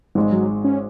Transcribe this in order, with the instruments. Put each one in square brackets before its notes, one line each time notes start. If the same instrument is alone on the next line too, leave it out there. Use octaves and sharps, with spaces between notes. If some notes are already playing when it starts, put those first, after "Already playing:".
[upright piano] G#1 G#2 G#3 D#4
[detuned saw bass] F#3
C#4